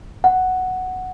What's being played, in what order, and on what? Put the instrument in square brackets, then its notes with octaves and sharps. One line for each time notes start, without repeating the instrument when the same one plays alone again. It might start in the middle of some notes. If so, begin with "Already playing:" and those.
[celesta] F#5